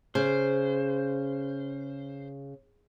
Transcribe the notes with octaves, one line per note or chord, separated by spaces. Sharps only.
C#3 C5